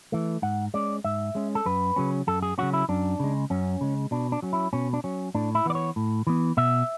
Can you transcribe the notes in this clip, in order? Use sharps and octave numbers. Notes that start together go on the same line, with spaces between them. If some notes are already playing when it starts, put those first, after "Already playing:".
E3 A3
G#2 F#5
G#3 C#4 D5
G#2 E5
G#3 C#4
A4
F#2 B4
C#3 F#3 C#4
F#2 A4
G#4
C#3 F#3 C#4 F#4
E4
F#2 D4
C#3 G#3
F#2 C#4
C#3 G#3
B2 D4
D4
F#3 C#4
E4
B2 C#4
D4
F#3 C#4
A2 D4
E4
E3 B3 D5
C#5
A2
E3 B3
B2 E5